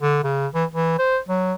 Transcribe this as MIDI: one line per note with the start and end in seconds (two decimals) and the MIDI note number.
0.01 0.19 50
0.24 0.47 49
0.54 0.65 52
0.71 0.98 52
0.99 1.19 72
1.29 1.54 54